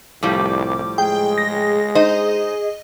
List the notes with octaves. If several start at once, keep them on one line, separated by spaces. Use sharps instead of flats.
C2 A2 F3 G3 D6
G#3 G#4 G5
A#6
D#4 C5 D#5